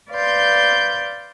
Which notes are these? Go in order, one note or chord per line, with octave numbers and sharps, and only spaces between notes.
B4 D5 F5 C6 G6